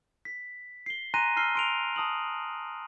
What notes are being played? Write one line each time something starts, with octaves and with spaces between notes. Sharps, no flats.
B6
C7 G7
G#5 A#5 C6 F#6 A#6 D#7
A5 E6 F6 C7 G7
C6 D7 F7
A5 D#6 F#7